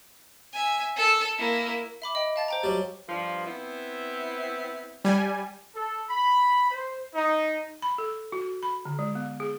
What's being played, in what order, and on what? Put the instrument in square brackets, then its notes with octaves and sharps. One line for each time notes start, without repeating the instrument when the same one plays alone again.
[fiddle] E5 G#5
A4
A#3 E4
[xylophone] E5 B5 D6
D#5 G5
F5 A5 A6
C5 G5 A#5
[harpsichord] F#3 G3
[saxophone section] G2 F3
B3 C4 E4
[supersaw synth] G3 G#5
[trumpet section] A4
B5
C5
D#4
[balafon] B5
A4
F#4
B5
D3
G#3
B3
G#4